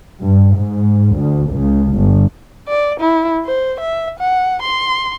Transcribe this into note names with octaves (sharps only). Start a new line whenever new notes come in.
G2
G#2
D2
C#2
G1
D5
E4
C5
E5
F#5
C6